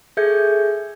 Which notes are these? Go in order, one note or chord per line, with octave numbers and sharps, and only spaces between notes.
G#4 A4 E5 G6 G#6 C#7